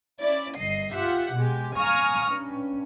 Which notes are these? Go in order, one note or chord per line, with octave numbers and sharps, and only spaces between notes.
C#4 E4 D5
G1 G2 D#5 C7
F4 G4 E5 F#5
B2 G#3 G4
F5 G#5 A#5 C#6 D#6 F6
G2 C#4